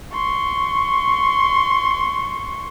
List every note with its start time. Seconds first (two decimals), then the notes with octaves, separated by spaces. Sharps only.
0.13 C6 C#6